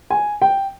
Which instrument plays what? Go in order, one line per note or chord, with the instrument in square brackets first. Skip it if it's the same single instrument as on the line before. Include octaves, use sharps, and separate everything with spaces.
[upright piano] G#5
G5